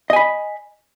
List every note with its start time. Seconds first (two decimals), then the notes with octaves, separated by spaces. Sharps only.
0.10 D#5
0.13 G#5
0.16 B5